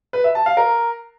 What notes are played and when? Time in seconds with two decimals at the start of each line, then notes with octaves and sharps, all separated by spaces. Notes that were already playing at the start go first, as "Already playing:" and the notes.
0.13 B4
0.24 E5
0.35 A5
0.46 F5
0.57 A#4